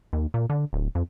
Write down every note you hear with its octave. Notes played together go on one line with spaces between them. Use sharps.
D#2
A#2
D3
D1
F2